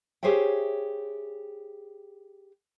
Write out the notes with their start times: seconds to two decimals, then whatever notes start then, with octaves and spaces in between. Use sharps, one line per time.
0.23 G4 G#4 C5 C#5 E5 G5